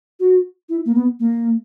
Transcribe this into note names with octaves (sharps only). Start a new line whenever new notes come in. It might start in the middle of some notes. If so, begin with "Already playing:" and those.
F#4
E4
A#3
B3
A#3